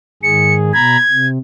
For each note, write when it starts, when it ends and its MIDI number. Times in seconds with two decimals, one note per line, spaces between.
0.23 0.72 44
0.23 0.72 51
0.23 0.72 68
0.23 0.54 97
0.73 0.97 47
0.73 0.97 82
0.73 0.97 83
0.73 1.27 92
1.11 1.38 48